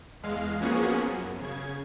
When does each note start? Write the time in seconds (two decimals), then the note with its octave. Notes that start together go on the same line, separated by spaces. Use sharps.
0.23 E2 G#3 F5
0.60 F3 A#3 B3 C#4 F#4 G#4
1.06 F#2
1.42 C#3 G#6